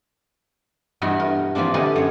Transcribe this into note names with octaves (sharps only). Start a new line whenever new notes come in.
G2 B2 E3 F#4 G5
A#4
E3 F3 A#3 C4 D4
B2 D3 G4 A4 A#4 G#5
F#2 C#5